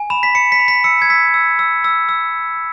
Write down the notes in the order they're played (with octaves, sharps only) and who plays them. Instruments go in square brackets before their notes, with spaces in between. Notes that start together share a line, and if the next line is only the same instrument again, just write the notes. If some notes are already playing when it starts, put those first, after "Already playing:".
Already playing: [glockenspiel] G#5
B5 E7
B6
B5 C#7
B6
B5
B6
E6 C#7
G#6
E6 B6
E6
E6
E6
E6